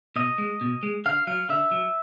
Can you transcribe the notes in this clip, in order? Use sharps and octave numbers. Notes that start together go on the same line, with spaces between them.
B2 D#5
G#3
B2
G#3
D3 F5
F#3 F5
D3 E5
F#3